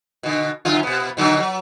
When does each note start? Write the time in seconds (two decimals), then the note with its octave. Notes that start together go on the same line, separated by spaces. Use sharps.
0.23 B2 D3
0.65 F#2 D3 F4
0.83 B2 B3
1.17 B2 D3 F#3
1.40 F#3